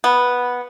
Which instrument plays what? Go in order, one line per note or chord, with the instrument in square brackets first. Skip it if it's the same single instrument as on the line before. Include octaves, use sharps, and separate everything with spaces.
[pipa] B3